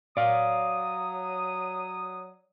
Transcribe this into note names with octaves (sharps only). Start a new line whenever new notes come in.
F#3 D5 F5 D#6